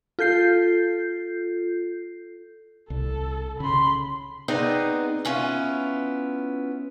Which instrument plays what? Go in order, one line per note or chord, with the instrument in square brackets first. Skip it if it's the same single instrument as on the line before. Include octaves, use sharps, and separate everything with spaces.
[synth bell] F4 A4 G6 C7
[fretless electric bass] C2 [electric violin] A4
[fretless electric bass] C#3 [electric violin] B5 C6
[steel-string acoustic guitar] B3 C4 D#4 G#4 D5
B3 C#4 E4 F4